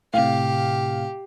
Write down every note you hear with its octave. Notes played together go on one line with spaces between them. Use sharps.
A2 C3 G4 F5